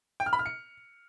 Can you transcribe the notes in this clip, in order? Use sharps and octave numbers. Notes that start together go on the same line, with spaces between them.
G5
F6
B5
F6
C#7